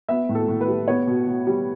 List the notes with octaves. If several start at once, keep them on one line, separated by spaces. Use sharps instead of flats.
B3 E5
A2
A4
A2
B4
G3
B3 C#5
B2
B2
G3